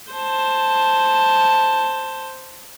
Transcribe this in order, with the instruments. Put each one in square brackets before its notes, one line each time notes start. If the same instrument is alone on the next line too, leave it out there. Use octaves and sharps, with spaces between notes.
[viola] C5 A5